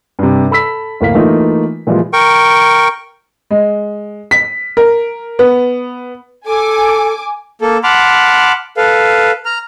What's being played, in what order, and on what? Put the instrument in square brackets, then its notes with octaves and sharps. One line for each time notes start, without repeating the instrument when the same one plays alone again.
[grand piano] G2 C3
A4 B5 E6 B6
D1 A2 A#3 F5 B6
E3 A3 A#3 D#4 F4
A#2 E3 F3 G3 G#3 F4
[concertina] A#4 G5 C#6
[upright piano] G#3
B6
A#4
B3
[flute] A4 [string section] G#5 D6
[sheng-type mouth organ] A#3 A4
F#5 A5 B5 C6 D6 F6
A4 B4 F5
A#5 F6